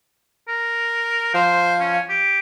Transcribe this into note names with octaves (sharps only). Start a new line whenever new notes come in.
A#4
F3 C5
C#4
G4